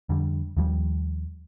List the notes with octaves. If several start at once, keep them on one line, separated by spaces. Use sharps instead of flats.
F2 D3 G3
D#2 F3 G3